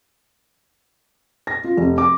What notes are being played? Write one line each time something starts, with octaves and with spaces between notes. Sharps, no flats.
A#6
F4
F1
D6